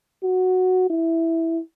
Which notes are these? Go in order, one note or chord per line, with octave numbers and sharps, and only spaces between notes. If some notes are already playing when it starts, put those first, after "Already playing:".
F#4
E4